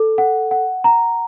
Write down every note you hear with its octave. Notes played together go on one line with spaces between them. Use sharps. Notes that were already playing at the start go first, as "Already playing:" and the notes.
Already playing: A4
F#5
F#5
A#5